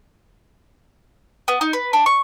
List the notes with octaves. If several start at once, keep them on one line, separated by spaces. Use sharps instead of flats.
B3
D#4
B4
D4
C#6